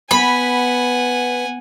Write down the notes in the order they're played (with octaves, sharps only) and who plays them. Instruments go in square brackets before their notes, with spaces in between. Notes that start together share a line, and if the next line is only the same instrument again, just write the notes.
[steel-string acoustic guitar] B3 [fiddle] F#5 G#5 [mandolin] B5